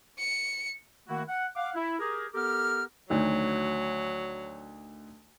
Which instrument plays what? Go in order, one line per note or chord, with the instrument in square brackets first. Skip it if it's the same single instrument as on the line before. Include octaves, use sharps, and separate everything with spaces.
[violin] C#7
[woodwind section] D#3 A3 A#3 E4 F#4
F#5
F5 F#5 D6
E4
G4 G#4 A#4
B3 G4 A4 A#4 D6 F6
[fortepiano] D2 D#3 [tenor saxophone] F#3